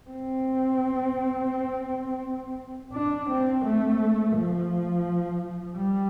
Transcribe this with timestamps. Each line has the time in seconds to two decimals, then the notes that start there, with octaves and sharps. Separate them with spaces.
0.11 C4
2.94 D4
3.30 C4
3.65 A3
4.36 F3
5.77 G3